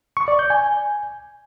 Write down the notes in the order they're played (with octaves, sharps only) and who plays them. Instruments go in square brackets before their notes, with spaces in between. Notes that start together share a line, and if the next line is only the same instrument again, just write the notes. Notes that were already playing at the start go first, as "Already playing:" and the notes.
[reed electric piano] C#6
D5
G6
G#5